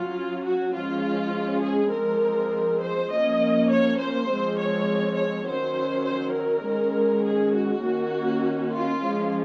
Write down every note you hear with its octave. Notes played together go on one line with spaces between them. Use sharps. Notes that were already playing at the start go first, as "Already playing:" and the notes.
Already playing: F#3 C#4 F4
F#4
F3 G#3 C#4 F4
G#4
F3 G#3 C4 A#4
C5
F3 A#3 C#4 D#5
C#5
C5
F3 G#3 C4
C#5
C#5
D#3 F#3 C#4 C5
C5
A#4
D#3 G#3 C#4
G#4
F#4
D#3 A#3 C#4
F4
F3 G#3 C#4